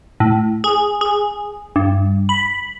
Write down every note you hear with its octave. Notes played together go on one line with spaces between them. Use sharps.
A2
G#4
G#4
G2
B5